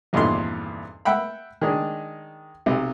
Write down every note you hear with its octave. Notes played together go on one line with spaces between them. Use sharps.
G#1 E2 G2 A#2 D3 C6
E5 F#5 G5 B5
D#3 G#3 D4
B1 C3